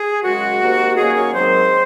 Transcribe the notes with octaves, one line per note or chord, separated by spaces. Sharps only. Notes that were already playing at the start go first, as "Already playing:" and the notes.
Already playing: G#4
F#2 C#3 G#3 F#4
C3 D#3 A#3
F#2 D#3 A#3 C#4 G#4
C#5
G#2 D#3 F#3 C4 C5